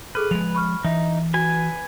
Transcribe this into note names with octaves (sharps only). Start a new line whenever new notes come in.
G#4 A4 B4 F6
F3 G#3 F7
B5 C#6 F6
E3 D#4 E5
F#4 B4 G#5